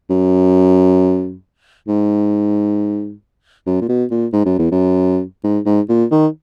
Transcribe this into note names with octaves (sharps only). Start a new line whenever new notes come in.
F#2
G#2
F#2
A#2
B2
A#2
G#2
F#2
E2
F#2
G#2
G#2
A#2
D#3